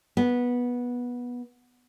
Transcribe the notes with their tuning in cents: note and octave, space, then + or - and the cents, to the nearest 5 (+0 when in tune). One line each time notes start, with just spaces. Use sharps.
B3 -15